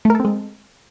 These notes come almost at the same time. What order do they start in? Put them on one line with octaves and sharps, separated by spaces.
A3 A#4 A4 C4 G#3